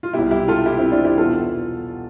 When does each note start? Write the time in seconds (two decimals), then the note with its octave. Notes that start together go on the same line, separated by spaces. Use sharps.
0.03 F4
0.13 B2 E4 G4
0.18 C2
0.31 E4 G4
0.48 F4 A4
0.66 E4 G4
0.79 C4 E4
0.91 D4 F4
1.05 E4 G4
1.18 E2 B2 F4 A4